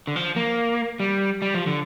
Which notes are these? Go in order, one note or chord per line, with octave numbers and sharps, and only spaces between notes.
D3
F3
A#3
G3
G3
F3
D3